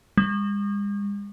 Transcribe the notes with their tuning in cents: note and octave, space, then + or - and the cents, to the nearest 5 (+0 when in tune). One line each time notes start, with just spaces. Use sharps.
G#3 -45